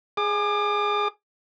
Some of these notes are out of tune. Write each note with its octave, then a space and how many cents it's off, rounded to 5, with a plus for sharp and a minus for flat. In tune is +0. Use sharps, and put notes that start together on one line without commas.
G#4 +0 D6 +35